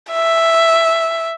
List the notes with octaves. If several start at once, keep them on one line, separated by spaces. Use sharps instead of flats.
E5